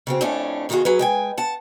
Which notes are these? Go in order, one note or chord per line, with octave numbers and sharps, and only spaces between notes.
C#3 F#3 C4
F2 A2 A3 C#4 D4
B2 D#3 D#4 F4 F#4 G#4
F#3 G#4 B4
G#3 G5 G#5
F#5 A5